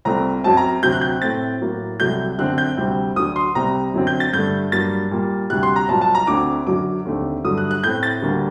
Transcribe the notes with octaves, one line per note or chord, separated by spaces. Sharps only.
C2 A#2 A3 C4 A#5
F#2 F#3 C4 A5
A#5
D2 C3 F#3 C4 G6
F#6
G6
A2 A3 C4 A6
A2 F#3 A#3
C2 C3 F#3 A3 G6
F#2 D3 A3 C4 F#6
G6
D2 C3 G3 C4
D2 D3 F#3 D#6
C6
C2 C3 G3 C4 A#5
F#2 D3 F#3 C4
G6
A6
G2 D3 A3 G6
G2 F#3 A#3 A6
A#2 G3 A#3
D2 C3 G3 F#6
C6
A#5
C2 A#2 F#3 A5
A5
A#5
D2 D3 A3 C4 D6
F#2 D3 F#3 D6
D#2 D3 A3 C4
G2 D3 F#3 A3 D#6
F#6
F#6
A2 A3 C4 G6
A6
D2 D3 G3 A#3